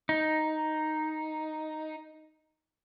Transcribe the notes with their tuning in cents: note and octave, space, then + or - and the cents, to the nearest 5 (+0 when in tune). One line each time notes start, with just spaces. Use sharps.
D#4 +0